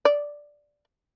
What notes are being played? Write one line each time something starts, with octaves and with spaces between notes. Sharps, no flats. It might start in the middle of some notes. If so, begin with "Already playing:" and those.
D5